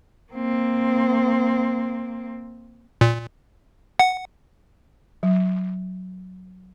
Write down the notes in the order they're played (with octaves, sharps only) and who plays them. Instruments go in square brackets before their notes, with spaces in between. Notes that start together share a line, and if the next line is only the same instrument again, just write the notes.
[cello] A#3 C4
[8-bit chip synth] A#2
F#5
[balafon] F#3